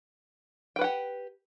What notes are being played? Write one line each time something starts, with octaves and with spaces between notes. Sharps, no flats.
G4 B4 F#5 G5